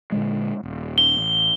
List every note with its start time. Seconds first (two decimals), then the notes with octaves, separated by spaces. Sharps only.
0.12 A#2 D3 G#3
0.63 D#1
0.98 G7
1.17 A1